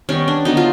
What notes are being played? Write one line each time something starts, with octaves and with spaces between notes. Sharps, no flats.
D#3 G3 B3 C#4
D4
D3 F#3 B3 D#4
F4